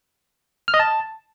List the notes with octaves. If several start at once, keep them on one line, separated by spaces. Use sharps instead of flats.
F6
D#5
A5